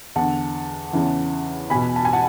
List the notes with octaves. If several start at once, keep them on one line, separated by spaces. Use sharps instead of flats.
E2 D3 F#5 A5
E2 C#3 E3
E2 B2 G#5 B5
A5
G#5
F#5 A5